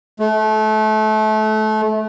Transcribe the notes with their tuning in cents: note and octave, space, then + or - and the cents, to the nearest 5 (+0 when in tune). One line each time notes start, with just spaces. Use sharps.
A3 -25